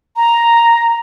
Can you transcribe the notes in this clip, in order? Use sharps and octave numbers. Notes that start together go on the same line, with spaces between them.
A#5